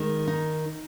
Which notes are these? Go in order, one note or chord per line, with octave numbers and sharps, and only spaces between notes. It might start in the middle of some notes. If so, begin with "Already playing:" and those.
Already playing: D#3 G#3
D#4